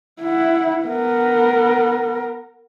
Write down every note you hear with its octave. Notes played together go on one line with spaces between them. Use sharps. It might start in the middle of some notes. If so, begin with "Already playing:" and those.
E4 F#5
B3 A#4